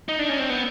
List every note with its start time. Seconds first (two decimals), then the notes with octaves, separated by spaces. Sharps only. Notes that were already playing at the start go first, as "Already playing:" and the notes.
0.09 D#4
0.19 D4
0.29 C#4
0.39 C4
0.50 B3